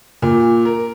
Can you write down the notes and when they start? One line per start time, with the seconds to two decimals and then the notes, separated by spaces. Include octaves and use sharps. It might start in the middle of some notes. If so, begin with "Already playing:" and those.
0.22 A#2
0.65 A#4